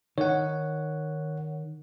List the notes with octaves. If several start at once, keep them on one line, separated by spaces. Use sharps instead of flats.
D#3 C#5 F#5